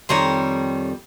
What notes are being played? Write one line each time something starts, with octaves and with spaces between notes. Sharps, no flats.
F2 D#3 G3 C#5 A#5 C6